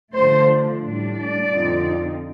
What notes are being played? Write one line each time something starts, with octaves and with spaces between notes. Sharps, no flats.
D3 F3 A3 D4 C5
A2 G3 D4
D5
F2 D3 F3 C4 D#4